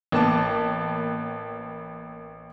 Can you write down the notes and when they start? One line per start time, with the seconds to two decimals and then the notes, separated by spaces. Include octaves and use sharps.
0.12 A1 A#3 B3 A5 D6